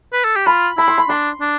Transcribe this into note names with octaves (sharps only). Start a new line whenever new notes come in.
B4
A4
G4
F4 B5
E4 B5
C6
B5
D4 C6
D4